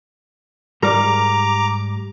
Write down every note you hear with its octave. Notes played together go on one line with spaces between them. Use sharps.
G#2 G3 A#4 A#5 D6